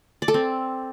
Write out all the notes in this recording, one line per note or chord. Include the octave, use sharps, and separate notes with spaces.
D5
A4
C4